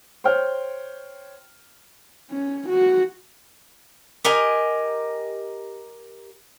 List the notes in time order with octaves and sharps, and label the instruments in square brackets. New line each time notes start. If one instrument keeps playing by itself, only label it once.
[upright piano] C5 C#5 G5 F6
[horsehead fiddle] C#4
F#4
[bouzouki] G4 A#4 D#5 G#5